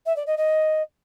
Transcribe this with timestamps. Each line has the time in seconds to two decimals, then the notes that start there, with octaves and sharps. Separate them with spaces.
0.06 E5
0.16 D5
0.26 D#5
0.37 D#5